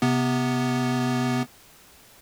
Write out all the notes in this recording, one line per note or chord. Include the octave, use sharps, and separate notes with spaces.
C3 B3